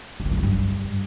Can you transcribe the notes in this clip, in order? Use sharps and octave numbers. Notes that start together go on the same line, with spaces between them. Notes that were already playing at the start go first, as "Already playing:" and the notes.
D3
D#3
F3
E3
G2